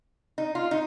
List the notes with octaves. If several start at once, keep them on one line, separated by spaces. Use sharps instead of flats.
D#4
F4
D#4